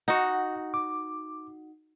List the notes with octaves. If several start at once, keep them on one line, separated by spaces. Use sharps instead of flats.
D#4 F#4 F#5
D6